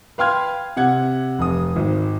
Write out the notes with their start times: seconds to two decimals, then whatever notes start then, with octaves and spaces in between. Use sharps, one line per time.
0.18 B4 F5 G5 C6 F6 G#6
0.76 C3 F#5 G#6
1.39 F1 D#6
1.76 G#1